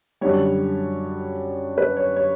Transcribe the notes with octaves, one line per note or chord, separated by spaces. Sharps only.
F#2 D3 G3 C#5
B4
C#5
C#5